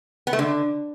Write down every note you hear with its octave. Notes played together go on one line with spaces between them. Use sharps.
B3
A3
D3